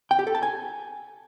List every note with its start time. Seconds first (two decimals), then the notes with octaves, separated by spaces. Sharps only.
0.11 G5
0.19 G4
0.27 A4
0.35 A5
0.43 G#5